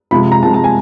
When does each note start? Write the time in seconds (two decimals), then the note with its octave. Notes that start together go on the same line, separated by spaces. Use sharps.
0.11 C3 F3 G#3 B5
0.32 A#5
0.43 C3 F3 G#3 A5
0.54 A5
0.64 G#5